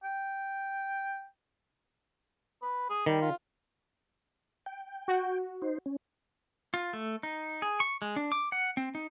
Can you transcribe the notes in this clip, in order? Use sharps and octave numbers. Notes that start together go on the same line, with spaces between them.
G5
B4
G#4
D#3 G3
F4
G5
F#4
D#4 C5
C#4
F4
A3
D#4
G#4
C#6
G#3
D4
D6
F#5
C4
D#4